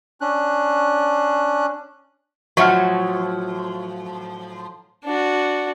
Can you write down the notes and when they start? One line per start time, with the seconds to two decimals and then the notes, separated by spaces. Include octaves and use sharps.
0.21 C#4 D4 F#6
2.57 A2 F3 F#3 D#5 E5 F#5 C#6 F6
5.05 D4 F#4